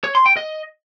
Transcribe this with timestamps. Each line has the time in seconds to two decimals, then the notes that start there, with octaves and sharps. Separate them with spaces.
0.04 C#5
0.15 C6
0.26 G5
0.37 D#5